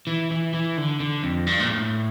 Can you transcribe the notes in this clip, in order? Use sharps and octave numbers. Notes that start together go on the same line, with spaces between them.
E3
E3
E3
D3
D3
F2
G2
A#2
A2